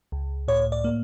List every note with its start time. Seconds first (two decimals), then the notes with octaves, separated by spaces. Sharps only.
0.12 C#2
0.48 A2 C#5
0.72 D5
0.84 A#3